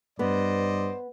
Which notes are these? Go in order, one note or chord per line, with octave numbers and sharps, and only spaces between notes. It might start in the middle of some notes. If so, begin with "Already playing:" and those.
G2 B3 C5 D5 D#5